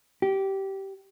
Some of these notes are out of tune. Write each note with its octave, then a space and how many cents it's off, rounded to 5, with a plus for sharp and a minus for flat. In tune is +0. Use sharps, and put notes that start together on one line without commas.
G4 -15